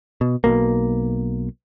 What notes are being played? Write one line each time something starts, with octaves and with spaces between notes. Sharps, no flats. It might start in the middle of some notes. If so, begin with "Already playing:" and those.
B2
B1 E2 B2 A#3